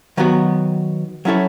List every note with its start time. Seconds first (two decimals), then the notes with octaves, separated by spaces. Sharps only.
0.17 D#3 F#3 B3 F#4
1.25 F#3 C#4 E4 A4 C#5